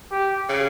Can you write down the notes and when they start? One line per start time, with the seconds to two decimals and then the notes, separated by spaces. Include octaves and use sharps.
0.11 G4
0.49 C#3